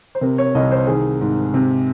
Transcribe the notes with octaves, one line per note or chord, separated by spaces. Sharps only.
C5
C3 A#4
C#5
C2 D#5
C5
D#3 G#4
G#2
C3